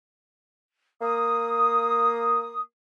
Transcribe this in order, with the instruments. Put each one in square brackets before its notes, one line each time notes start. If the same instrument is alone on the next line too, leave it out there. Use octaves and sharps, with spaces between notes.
[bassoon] A#3 [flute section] D#6